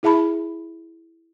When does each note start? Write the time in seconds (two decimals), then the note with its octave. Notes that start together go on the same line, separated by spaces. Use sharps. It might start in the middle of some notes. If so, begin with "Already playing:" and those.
0.03 E4 G#4 E5 A5 B5